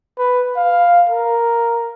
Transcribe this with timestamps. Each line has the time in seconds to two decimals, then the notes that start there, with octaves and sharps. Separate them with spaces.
0.18 B4
0.56 F5
1.09 A#4